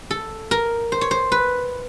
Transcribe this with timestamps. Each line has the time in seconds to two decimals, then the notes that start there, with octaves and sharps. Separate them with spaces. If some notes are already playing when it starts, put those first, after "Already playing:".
0.11 A4
0.51 A#4
0.92 C5
1.01 C#5
1.11 C5
1.32 B4